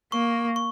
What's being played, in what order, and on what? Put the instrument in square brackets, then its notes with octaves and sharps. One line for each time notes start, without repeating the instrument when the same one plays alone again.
[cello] A#3 [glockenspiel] C#6
[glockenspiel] C#6